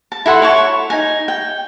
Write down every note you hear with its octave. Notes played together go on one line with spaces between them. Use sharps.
A5
E4 A4 F#5 C6
C#5 A5 C#6
D#4 G#5
G5